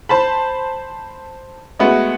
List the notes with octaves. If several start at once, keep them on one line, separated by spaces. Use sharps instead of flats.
C5 A5 B5
G#3 A3 B3 F#4